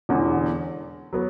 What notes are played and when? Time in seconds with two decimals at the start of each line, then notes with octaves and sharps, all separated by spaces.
0.09 E1 E2 D3
1.13 F#3 B3